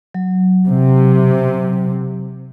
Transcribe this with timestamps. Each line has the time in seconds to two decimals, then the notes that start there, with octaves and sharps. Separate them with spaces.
0.14 F#3
0.68 C3